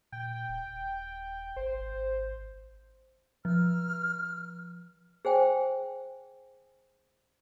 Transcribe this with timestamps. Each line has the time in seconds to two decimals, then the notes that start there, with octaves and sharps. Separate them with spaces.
0.12 A#2 G5
0.49 D#1
1.56 G#1 C5
3.45 F3 E6 F6
5.25 G#4 C5 G5 G#5